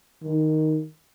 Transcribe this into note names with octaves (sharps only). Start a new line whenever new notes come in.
D#3